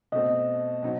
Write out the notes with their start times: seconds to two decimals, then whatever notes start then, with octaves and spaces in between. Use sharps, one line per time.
0.12 B2 A3 C4 D#5
0.83 B2 F#3 C4 D#4